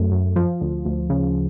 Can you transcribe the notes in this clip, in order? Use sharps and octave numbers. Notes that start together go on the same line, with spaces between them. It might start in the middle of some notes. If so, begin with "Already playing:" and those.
Already playing: F#2 A3
F#2
F3
D2
D2
C#3